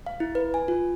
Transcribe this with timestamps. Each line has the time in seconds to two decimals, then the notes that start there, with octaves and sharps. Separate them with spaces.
0.06 F5
0.20 E4
0.35 B4
0.54 G#5
0.68 F4